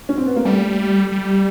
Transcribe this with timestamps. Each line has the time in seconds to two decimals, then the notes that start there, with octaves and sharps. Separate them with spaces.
0.09 C#4
0.18 C4
0.26 B3
0.36 A#3
0.45 G3 A3
1.12 G3